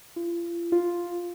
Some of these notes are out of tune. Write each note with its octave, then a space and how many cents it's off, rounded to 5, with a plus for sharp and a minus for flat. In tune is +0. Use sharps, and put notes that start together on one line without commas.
F4 -40
F4 +0